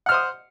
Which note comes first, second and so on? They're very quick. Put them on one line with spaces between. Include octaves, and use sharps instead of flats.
F#5 F6 C5 D#6